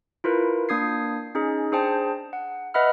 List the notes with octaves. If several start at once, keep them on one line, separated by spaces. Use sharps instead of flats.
E4 F4 A#4 B4
A#3 D4 D#6 G#6 C7
C#4 D#4 G#4
D4 G#4 C5 G5 A5
F#5
B4 D#5 E5 F#5 B5 F6